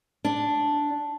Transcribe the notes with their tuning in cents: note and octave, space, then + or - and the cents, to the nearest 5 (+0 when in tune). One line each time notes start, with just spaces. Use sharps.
D4 -5